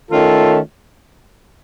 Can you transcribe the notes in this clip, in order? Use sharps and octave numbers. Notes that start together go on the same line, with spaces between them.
D#3 A3 C#4 F4 A4